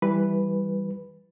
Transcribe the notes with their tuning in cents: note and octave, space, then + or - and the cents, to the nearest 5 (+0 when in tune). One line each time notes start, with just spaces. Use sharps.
E3 +0 G3 +0 B4 +0